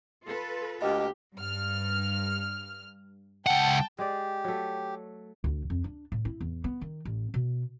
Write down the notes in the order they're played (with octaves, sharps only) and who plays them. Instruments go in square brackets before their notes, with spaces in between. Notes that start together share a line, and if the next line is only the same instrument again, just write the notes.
[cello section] F4 A4 B4
[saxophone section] D2 A#3 [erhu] G4 [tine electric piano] D#5
[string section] G2 F6
[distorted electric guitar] C#2 F#5 [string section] G5 A5
[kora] G#3 D5 [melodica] G4
[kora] F#3 A3
[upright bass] D2
F2
D4
A2
E4
E2
B3
D#3
A1
B2